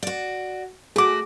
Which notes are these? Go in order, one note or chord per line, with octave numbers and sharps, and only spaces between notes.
F#4 D5
A3 F#4 G#4 D6